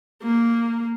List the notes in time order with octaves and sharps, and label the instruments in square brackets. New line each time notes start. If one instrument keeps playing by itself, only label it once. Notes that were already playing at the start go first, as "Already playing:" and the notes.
[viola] A#3